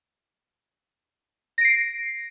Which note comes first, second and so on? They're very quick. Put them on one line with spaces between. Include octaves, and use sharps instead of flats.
A#6 D7 C7